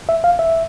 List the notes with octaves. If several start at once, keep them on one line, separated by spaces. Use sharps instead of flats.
E5
F5
E5